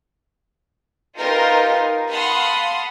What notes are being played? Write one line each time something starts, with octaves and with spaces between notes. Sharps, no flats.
D#4 F4 G4 A#4 B4
F5 F#5 A5 B5 C6 D#6